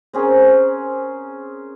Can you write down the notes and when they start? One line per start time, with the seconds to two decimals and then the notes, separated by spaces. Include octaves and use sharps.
0.13 C4 C#4 G#4 A#4